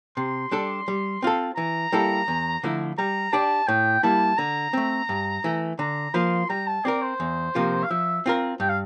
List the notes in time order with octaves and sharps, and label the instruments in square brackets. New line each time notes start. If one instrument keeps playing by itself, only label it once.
[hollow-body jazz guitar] C3 [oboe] C6
[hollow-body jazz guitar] G3 D4 A4
G3
C4 F4 A4
[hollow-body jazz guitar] E3 [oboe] A#5
[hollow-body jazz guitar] G3 A#3 E4 A4
E2
D3 F3 A3 E4
[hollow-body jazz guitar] G3 [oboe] A#5
[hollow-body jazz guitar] D4 G4 D5 [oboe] A5
[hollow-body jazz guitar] A2 [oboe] G5
[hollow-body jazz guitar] G3 A#3 E4 [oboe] A5
[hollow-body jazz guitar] D3 [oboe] A#5
[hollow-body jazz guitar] A3 C4
G2
E3 A3
[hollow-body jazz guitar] D3 [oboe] A#5
[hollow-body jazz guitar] F3 A#3 F4 [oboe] C6
[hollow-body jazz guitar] G3 [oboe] A#5
[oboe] A5
[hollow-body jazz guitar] C4 G4 A#4 [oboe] D5
[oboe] C5
[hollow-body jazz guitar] E2
C3 F3 A#3 F4
[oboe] F5
[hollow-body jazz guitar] F3 [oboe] E5
[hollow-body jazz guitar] C4 F4 A#4
[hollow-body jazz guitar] G2 [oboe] G5
[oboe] F5